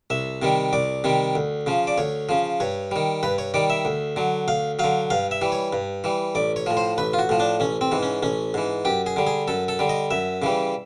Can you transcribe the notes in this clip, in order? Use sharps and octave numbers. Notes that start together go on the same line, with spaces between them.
C2 E5
C3 D#3 G3
C2 D5
C3 D#3 G3
D2
C#3 F3
D5
D2 C#5
C#3 F3
G2 C#5
D#3 G3
G2 B4
C#5
D#3 G3 D5
E5
D2
D3 F#3
D2 F5
D3 F#3 F5
G2 F5
E5
E3 G3
C#5
G2
E3 G3
A1 D5
C#5
A2 F3
C5
A1 B4
F4
F#4
A2 F3
D4
A1 C#4
C4
G#2 E3
C#4
A1 C#4
G#2 E3
F#2 G4
G#4
D3 G3
G#4
F#2 A4
A4
D3 G3
D#5
F#2 E5
C#3 E3 G3